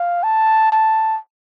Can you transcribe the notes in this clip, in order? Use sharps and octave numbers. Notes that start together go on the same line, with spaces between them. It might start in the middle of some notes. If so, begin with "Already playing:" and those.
Already playing: F5
A5
A5